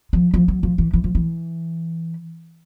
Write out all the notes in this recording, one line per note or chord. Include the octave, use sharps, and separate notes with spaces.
F3
F3
F#3
F3
E3
E3
F3
E3